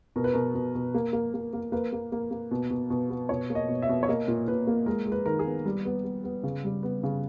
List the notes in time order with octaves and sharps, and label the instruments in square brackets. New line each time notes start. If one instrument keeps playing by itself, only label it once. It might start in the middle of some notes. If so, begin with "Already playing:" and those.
[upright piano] B2 A#4
B4
B2 A#4
B2
B2
A#3
A#3
A#3
A#3
A#3 B4
A#3
A#3
A#3
B2
B2
B2
B3
B2 C#5
A#3
D#5
B2
E5
B2
C#5
A#3 D#5
A#2
A#2 B4
A#3
G#3 A#4
G#3
B4
D#3 A#4
G#4
B3
G3
B3
B3
B3
C#3
G3
B3
C#3